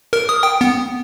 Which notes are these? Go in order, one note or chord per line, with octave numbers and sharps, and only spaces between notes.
A#4
D#6
G5
B3